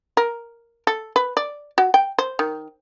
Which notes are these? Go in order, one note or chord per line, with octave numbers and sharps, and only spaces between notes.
A#4
A4
B4
D5
F#4
G5
C5
D#3